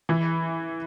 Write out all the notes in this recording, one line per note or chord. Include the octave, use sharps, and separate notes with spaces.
E3 E4